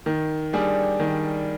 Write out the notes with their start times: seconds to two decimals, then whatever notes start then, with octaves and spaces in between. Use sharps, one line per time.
0.06 D#3
0.53 G3 D4 G#4
1.00 D#3